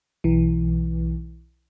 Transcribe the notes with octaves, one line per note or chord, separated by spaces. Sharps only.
B1 E3